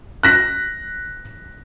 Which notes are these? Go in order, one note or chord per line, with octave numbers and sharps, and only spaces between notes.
F#6 A#6 B6